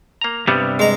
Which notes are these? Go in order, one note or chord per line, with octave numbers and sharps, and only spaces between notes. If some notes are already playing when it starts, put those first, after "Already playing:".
A#3 A#5
G2 C3 G3 B3
G#3 D#5 A#5